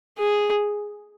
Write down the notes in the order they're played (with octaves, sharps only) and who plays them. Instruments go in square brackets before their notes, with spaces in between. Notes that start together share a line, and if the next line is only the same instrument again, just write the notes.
[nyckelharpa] G#4